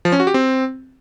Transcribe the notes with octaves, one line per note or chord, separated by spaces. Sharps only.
F3
C#4
F#4
G4
C4